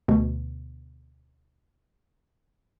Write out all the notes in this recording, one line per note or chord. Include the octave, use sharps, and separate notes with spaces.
D2 B2